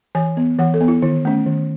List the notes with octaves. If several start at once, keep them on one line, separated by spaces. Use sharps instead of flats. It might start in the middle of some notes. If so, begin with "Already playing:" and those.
E3 G#5
B3
E3 F#5
A4
B3
E4
D#3 E4
A3 C#4
D#3